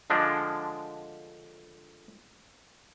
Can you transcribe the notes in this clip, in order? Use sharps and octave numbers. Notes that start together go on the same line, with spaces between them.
D3 F3 G#3 D4